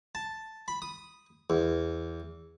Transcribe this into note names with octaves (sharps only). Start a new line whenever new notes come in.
A5
B5
D#6
E2